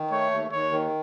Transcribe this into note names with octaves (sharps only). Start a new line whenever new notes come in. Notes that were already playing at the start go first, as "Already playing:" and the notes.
Already playing: D#3
A3 C#5
D#2
D#2 C#5
D#3